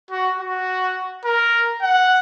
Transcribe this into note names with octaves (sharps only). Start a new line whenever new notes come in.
F#4
F#4
A#4
F#5